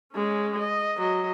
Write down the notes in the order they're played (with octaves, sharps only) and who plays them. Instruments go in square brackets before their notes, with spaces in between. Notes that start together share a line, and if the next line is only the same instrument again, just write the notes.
[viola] G#3 C#4
D#5
F#3 D#5